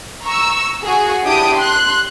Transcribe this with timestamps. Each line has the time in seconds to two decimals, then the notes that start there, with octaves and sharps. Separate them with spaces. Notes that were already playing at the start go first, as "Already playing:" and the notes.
0.23 A#5 C#6 E6
0.83 F#4 G#4
1.25 D4 E4 G4 D#6 D7
1.56 C6 F#6